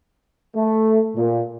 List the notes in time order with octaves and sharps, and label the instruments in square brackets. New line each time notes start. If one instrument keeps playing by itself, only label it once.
[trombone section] A3
A#2